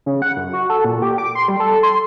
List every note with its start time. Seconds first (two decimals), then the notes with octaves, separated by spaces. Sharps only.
0.06 C#3
0.22 F#5
0.37 F#2
0.53 F#4
0.70 A4
0.85 A#2
1.02 G4
1.18 D6
1.35 C6
1.48 G3
1.60 A4
1.83 C6